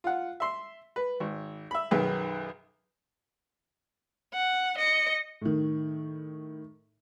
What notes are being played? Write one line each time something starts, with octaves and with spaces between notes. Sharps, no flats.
F4 F#5
E5 C6
B4
G#1
E5 B5
B1 F#2 D#3 G#4 B4
F#5
D#5 C#7
A2 D#3